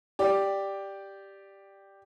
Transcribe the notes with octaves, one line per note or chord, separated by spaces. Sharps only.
G4 D5